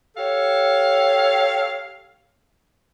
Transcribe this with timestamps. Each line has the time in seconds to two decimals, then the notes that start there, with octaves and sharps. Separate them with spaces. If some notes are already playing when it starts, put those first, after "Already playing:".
0.16 G4 A4 C#5 F5